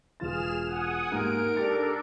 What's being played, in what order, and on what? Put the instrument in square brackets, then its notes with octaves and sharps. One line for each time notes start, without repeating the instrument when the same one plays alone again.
[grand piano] E1 F4 A6 [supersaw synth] G#4 F6 E7
[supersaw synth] F#5 G#5 D#6
[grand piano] G#2 A#3 G4 [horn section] A#4 [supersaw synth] D7
[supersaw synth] D4 A4 [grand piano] G4 A6 C#7